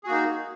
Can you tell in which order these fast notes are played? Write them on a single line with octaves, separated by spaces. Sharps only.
G#4 F#4 A#3 D#4